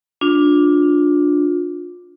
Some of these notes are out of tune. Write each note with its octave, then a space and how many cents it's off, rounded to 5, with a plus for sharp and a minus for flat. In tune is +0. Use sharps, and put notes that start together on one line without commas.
D4 +0 F4 +30